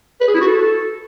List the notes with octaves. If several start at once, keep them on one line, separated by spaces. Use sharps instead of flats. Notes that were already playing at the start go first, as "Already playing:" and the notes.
B4
G#4
E4
F#4
A4